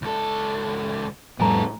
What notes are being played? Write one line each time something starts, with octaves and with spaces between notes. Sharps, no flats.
C#2 A4
F2 A2 G3 B3 A4 G#5 A#5